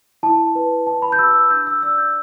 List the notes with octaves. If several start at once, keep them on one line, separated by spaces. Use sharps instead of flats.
E4 A5
B4
E4 A5
B5
G6
G4 E6
E6
D4 G6
E6
D5 E6
G6